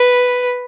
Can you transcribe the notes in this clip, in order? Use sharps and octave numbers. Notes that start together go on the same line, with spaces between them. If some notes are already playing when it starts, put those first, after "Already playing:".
Already playing: B4